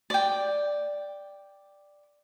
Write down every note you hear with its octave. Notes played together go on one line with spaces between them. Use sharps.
D5 G5